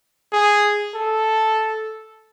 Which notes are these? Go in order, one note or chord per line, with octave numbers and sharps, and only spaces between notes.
G#4
A4